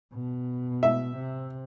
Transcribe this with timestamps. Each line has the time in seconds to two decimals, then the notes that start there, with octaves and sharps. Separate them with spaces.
0.13 B2
0.83 E5
1.17 C3